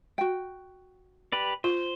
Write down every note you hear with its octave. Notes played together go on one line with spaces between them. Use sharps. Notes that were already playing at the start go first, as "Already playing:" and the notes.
F#4 G5
G4 B4 D5
F4 C5